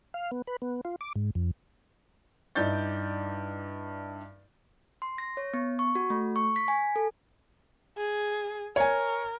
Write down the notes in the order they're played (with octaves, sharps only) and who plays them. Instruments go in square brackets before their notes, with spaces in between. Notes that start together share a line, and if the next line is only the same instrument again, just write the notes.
[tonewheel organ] F5
B3
B4
B3
F4
D6
G#2
F2
[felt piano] G2 D#4 E4 D5 G6 A6
[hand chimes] C6
A#6
C#5
B3
C#6
F#4
A3
C#6
B6
G#5
A4
[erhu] G#4
[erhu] A#4 [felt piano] C#5 G#5